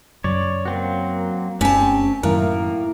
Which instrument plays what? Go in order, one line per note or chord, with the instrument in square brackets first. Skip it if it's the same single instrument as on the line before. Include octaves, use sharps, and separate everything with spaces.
[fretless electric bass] F#2 C#3 [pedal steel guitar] C#5 D5
[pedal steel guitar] F#3 C4 F#4 [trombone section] A#3
[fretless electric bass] F1 F#2 A3 [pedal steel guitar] C4 G4 [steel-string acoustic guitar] C#4 A5
[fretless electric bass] F#2 D#3 [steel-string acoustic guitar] A2 [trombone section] A#3 [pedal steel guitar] A#4